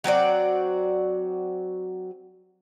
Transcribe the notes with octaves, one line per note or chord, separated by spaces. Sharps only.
F#3 C4 F#4 D5